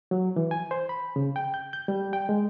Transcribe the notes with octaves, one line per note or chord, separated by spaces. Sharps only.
F#3
E3
G#5
C5
B5
C#3
G5
G6
G6
G3
G5
G#3